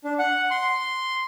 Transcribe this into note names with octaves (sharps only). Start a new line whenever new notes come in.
D4
F#5
C6